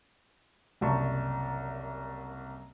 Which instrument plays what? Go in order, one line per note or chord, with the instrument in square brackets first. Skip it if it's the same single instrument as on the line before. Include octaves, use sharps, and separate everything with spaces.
[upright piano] F#1 C2 A5 C#6